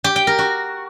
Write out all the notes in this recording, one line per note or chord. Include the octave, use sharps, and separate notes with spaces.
G4
G5
A#4
F#4